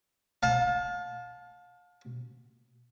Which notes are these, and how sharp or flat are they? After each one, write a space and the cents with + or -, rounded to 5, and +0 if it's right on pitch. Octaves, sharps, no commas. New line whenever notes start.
F5 +35 A5 -15